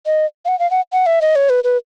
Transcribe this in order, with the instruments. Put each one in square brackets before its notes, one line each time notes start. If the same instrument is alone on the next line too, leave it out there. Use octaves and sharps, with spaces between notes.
[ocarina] D#5
F5
F#5
F5
F#5
F#5
E5
D#5
C#5
B4
B4